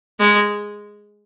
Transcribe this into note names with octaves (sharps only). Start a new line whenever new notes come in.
G#3